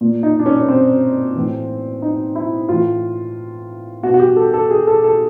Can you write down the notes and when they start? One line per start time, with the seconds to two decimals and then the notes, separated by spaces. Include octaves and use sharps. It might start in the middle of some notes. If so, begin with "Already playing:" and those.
0.01 A#2
0.23 D#4
0.39 D4
0.46 C#4
0.61 C#4
0.69 C4
1.35 A2 E3
2.02 D#4
2.35 E4
2.69 A2 E3 F4
4.03 B2 F#4
4.14 F#4
4.20 G4
4.36 A4
4.54 A4
4.71 G#4
4.87 A4
5.04 A4